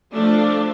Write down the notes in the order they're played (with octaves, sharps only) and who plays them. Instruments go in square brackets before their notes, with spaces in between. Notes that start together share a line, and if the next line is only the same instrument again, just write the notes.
[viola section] F3 A3 D4